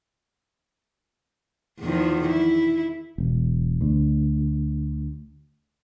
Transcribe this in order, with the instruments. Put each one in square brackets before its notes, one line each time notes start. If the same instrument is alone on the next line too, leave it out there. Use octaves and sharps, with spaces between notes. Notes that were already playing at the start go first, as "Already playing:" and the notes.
[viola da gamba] E2 D#3 F3
E4
[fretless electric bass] E1
D2